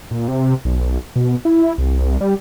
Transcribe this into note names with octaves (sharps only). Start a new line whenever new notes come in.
A#2
C3
B1
B2
E4
C2
G3